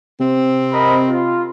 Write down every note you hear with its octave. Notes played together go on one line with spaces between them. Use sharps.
C3 C4
A#4 D#5 B5
F4